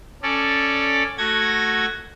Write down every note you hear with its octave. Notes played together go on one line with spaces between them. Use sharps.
C#4 A4 D5
A3 F#4 G#6 A#6